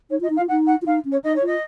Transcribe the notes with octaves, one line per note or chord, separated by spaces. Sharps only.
D#4 C#5
F4 D#5
D#4
F5
F4
D#4 F#5
F#5
F4
D#4 F5
C#4
C#5
D#4 D#5
C#5
F4 D#5